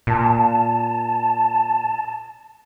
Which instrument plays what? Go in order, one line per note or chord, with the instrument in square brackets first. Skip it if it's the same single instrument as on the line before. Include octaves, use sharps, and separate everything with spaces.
[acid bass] A#2 [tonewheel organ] A5